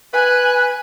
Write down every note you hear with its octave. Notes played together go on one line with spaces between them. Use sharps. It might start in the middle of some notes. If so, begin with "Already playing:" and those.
B4 G#5 F#6